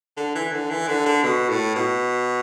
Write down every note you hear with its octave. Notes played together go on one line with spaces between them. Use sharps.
D3
E3
D3
E3
D3
D3
B2
A2
B2